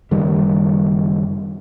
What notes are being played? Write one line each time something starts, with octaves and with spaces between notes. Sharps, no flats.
F#1 D#3 G3